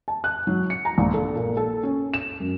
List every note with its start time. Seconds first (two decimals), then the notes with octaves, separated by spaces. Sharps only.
0.08 A5
0.24 F#6
0.47 F#3
0.70 C#7
0.85 A#5
0.98 A#1
1.14 A4
1.35 A#2
1.57 A4
1.83 C#4
2.14 E7
2.40 F#2